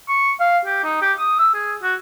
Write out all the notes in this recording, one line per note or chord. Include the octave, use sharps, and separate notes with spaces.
C#6
F5
G4
D#4
G4
D#6
E6
G#4
F#4